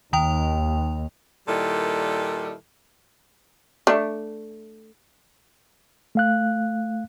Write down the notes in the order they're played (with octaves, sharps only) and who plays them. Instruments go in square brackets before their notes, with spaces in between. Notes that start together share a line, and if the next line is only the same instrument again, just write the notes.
[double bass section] D#2 [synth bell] D#3 G5 F7
[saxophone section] A#2 D#3 G3 E4 A4
[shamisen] A3 D4
[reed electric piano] A3 F5 F#6